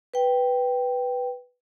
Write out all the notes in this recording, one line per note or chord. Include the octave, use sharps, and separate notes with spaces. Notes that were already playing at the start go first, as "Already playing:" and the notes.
B4 G5